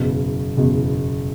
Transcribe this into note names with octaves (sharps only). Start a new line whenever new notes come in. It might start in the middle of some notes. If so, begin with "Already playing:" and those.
Already playing: F#1 E2 B2
F#1 E2 B2